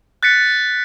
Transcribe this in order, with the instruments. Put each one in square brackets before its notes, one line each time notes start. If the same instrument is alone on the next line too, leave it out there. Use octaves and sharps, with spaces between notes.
[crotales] F#6 A6 B6 C#7